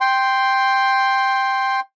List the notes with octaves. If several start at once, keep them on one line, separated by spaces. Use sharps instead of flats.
G5 C6